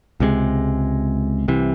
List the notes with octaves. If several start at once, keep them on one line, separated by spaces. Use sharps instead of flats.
C#2 C3 F3 G#3
C2 C3 E3